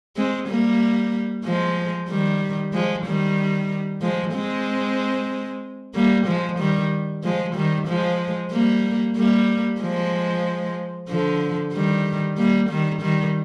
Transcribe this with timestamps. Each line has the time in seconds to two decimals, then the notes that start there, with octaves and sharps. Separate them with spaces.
0.17 G#3 C4
0.49 G3 A#3
1.45 F3 G#3
2.09 D#3 G3
2.73 F3 G#3
3.06 D#3 G3
4.02 F3 G#3
4.34 G#3 C4
5.95 G3 A#3
6.27 F3 G#3
6.59 D#3 G3
7.24 F3 G#3
7.56 D#3 G3
7.88 F3 G#3
8.52 G3 A#3
9.17 G3 A#3
9.81 F3 G#3
11.09 D3 F3
11.73 D#3 G3
12.37 G3 A#3
12.69 D#3 G3
13.02 D#3 G3